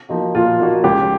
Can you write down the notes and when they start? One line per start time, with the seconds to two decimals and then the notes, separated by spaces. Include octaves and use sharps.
0.09 F3 A#3 D#4 F#4
0.35 A#2 F4
0.59 F3 A#3 D#4 F#4
0.84 C#2 G4